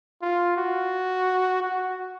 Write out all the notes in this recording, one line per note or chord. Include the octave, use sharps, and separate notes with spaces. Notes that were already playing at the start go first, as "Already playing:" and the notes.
F4
F#4
F#4